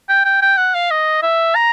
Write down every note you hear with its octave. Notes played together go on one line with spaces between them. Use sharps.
G5
G5
G5
F#5
F5
D#5
E5
A#5